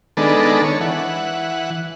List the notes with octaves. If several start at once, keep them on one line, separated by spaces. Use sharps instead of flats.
D#3 G#3 B3 D4 A4
C#5
E3 F#5